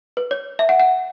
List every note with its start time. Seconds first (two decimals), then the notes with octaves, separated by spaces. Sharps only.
0.17 B4
0.31 C#5
0.59 E5
0.69 F#5
0.80 F#5